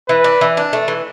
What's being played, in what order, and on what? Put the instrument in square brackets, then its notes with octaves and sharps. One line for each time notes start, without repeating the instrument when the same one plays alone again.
[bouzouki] E3 [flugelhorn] B4
[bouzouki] D4
E3
D4
A3
E3